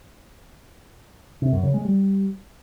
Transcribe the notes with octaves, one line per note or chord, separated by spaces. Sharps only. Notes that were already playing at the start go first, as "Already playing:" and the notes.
C3
F#2
C#3
G#3
G3